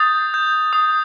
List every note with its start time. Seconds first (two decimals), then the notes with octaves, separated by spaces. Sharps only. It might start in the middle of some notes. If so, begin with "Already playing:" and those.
Already playing: D#6 G6 A6
0.34 G6
0.73 D#6